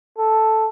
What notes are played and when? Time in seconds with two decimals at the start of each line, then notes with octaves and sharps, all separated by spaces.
0.18 A4